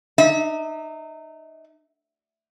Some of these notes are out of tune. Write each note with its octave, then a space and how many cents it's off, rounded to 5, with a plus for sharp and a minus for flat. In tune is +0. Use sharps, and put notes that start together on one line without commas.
D#4 -30 E5 -40